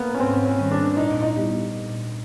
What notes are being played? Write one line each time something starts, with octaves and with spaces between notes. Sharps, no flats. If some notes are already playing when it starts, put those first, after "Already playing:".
Already playing: A#3 B3
C#4
G#2 C4
C#4
D#3 G3 C4
D4
A#2 D#4
D#4
G3 B3 E4 G4
A#2